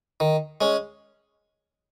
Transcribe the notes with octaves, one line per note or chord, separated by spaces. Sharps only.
D#3
G#3 C#4